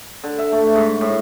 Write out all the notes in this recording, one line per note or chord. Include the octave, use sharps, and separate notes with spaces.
D3
E5
A3
G#2
A2